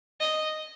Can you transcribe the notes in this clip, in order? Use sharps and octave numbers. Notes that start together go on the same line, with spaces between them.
D#5